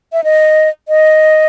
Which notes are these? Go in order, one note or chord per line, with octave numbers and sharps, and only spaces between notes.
E5
D#5
D#5